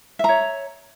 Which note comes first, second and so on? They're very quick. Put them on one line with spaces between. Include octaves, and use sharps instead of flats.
E5 A#5 C#5